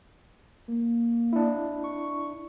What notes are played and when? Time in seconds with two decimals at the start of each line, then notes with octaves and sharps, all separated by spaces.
0.68 A#3
1.33 D4 E4
1.84 C#6